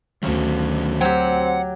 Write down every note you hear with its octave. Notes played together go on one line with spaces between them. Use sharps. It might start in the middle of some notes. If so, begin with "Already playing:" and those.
D2 D#3 F#3 C#4
F#3 C4 G4 F#5